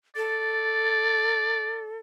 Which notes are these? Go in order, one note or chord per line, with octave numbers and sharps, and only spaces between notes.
A4 D5